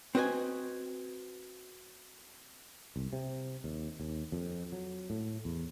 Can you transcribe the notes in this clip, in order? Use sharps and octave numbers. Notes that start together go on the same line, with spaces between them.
C4 F#4 B4 D#5 G#5
C2
C3
D#2
D#2
F2
F#3
A2
E2